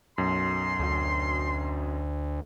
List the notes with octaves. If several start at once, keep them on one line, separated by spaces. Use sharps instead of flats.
B1 F#2 C6
D2